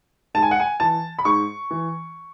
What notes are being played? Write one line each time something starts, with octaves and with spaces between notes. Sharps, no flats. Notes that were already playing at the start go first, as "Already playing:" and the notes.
G#2 A5
G#5
F#5
G#5
E3 A5
B5
G#2 C#6
E3